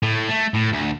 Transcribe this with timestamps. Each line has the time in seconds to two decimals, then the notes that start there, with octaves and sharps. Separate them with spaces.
0.03 A2
0.29 A3
0.54 A2
0.72 D2